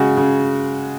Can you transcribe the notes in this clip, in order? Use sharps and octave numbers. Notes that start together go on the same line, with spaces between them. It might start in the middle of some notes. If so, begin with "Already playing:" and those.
Already playing: C#3 G#3 F#4 G#4
C#3